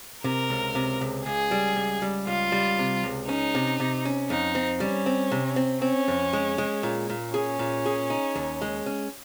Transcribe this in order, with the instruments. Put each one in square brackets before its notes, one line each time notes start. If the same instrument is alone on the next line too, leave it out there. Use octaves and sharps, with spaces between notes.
[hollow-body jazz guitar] C3 [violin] A#4
[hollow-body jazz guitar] C#2
C3
C#2
[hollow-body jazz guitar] C#2 [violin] G#4
[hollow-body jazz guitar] G3
C#2
G3
[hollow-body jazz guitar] C#2 [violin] F4
[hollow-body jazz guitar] G3
C3
C#2
[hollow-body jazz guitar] C#4 [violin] D#4
[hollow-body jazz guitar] C3
C3
C#4
[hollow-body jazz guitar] F2 [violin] D#4
[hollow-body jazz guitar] C4
[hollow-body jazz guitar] G3 [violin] C#4
[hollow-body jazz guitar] C4
C3
C4
[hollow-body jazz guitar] C4 [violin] C#4
[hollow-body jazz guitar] F2
G#3
G#3
A#2
A#2
[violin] C#4 [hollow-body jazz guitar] G#4
[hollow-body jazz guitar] A#2
G#4
D#4
D#2
G#3
C#4